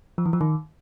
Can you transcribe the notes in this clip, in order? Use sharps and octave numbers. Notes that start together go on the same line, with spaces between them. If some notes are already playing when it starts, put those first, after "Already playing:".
F3
E3
F3
D#3